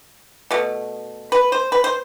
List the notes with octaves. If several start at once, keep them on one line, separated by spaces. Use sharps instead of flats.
B2 A3
B4
C5
B4
C5